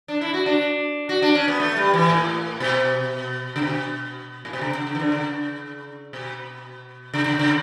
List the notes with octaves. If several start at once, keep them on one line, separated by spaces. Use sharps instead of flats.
D4
E4
F#4
D4
F#4
D4
C#4
B3
A3
G3
E3
A2
B2
C#3
B2
A2
B2
C#3
C#3
C#3
E3
D3
C#3
B2
C#3
C#3
C#3